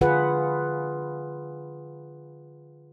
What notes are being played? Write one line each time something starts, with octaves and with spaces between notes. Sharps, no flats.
D3 F4 G#4 B4 F#5